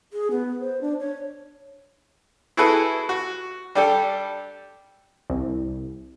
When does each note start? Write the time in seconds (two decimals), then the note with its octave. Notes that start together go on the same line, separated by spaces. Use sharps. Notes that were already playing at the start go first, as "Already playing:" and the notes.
0.13 G#4
0.31 B3
0.60 C5
0.81 D4
1.00 C#5
2.57 E4 F#4 G#4 A4 B4
3.09 F#4
3.75 G3 D4 G4 A4
5.30 C2